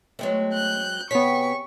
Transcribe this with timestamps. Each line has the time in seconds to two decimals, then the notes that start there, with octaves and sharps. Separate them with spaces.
0.19 F#3 G#3 A3 B3 C4
0.53 F#6 G6
1.11 C3 B3 G#4 C#5 C#6 B6